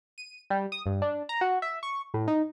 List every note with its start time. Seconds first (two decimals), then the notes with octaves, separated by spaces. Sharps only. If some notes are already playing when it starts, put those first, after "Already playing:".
0.18 D#7
0.50 G3
0.72 D#6
0.86 G2
1.02 D4
1.29 A#5
1.41 F#4
1.62 E5
1.83 C#6
2.14 A2
2.28 D#4